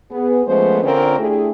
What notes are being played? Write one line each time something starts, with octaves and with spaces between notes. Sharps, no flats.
B3 G#4
F3 G#3 A3 B3 C#4 C5
A#2 D3 A#3 C4 C#4 A#4
A3 D4 E4 G4 G#4